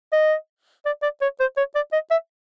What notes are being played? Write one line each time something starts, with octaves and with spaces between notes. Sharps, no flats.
D#5
D5
D5
C#5
C5
C#5
D5
D#5
E5